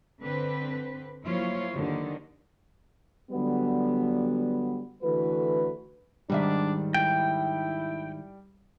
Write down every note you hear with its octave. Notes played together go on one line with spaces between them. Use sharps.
D3 C4 B4
F3 F#3 A#3 E4 F4 C#5
D#2 D3 D#3
D3 F#3 G3 B3
D3 E3 A3 F#4 B4
G#2 D#3 G3 D4 E5
E4 G5